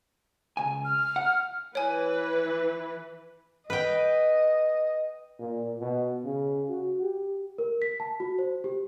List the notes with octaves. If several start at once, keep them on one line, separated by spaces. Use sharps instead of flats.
C#2 G#5
F6
F#5
E3 B4 C#5 G#5
B4 D#5 G5
A#2
B2
C#3
F#4
G4
A#4
B6
A5
F#4
C5
G4